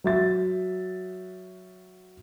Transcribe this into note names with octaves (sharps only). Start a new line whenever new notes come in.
F#3 E5 A6